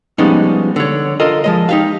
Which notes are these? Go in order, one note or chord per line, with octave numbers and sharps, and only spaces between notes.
F3 G3 G#3 B3 C#4 D#4
D3 C#5
F4 A4 A#4 D#5
F3 G#3 D#5
D#4 G4 F5